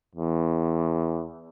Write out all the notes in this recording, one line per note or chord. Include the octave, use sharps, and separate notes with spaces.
E2